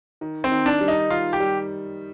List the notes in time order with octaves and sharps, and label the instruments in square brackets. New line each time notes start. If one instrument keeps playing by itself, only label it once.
[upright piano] D#3
[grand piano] C4
[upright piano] D#3
[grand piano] D4
[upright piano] G3
[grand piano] D#4
[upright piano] D#3 [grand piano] F4
[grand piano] G4
[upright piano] G3